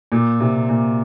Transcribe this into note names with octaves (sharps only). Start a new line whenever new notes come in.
A#2
C3
A#2